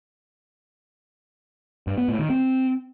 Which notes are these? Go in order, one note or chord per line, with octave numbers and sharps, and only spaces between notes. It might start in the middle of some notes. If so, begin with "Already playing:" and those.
G2
B3
A2
D#3
C4